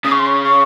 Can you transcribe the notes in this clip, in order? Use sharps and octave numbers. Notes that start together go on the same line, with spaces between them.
C#3 D#6
C#6
C6
C#6
C#6